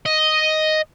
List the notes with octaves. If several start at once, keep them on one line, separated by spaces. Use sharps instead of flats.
D#5